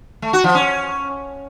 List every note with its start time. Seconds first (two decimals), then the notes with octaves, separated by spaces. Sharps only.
0.22 A3
0.33 F#4
0.44 F3
0.55 C#4